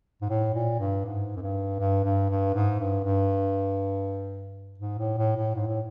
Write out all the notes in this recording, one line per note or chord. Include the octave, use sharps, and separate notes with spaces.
G#2
A2
A#2
G2
G#2
F#2
G2
G2
G2
G2
G#2
G2
G2
G#2
A2
A2
A2
G#2
A2